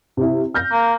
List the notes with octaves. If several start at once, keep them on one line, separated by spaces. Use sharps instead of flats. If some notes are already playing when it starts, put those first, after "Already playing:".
C3 E4
F6 G6 A#6
A#3